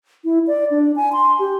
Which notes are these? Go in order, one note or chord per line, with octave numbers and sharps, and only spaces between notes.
E4
D5
D4
G#5
C6
G4